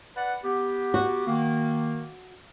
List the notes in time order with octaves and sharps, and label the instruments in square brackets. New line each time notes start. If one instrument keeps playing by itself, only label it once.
[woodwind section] B4 D5 F#5
B3 G4
[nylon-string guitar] F#4
[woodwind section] D#3 A#3